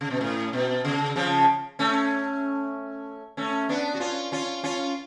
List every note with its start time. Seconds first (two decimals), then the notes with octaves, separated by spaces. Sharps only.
0.01 C#3
0.10 B2
0.21 A2
0.53 B2
0.85 C#3
1.16 C#3 F3
1.79 A3 C#4
3.37 A3 C#4
3.69 B3 D4
3.95 F#4
4.00 C#4 F4
4.32 C#4 F4
4.64 C#4 F4